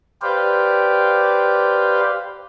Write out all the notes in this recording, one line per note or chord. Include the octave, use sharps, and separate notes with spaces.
G4 B4 C5 D5 F5 G5